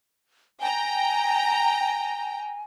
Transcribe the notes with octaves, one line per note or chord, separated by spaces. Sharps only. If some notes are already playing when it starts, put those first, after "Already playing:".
G5 G#5 A#5